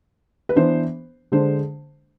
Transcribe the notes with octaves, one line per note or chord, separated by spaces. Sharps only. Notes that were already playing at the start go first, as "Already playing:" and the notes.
B4
E3 B3 D4 C5
D3 G#3 D4 C5